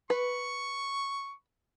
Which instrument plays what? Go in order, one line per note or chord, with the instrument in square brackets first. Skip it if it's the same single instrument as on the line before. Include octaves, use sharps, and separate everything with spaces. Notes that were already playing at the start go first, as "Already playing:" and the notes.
[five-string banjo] B4 [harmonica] C#6